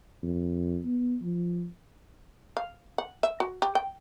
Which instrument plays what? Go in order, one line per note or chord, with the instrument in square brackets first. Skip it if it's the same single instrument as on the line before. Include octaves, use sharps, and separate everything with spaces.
[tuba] F2
B3
F3
[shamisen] F5
F#5
E5
F#4
G4
G5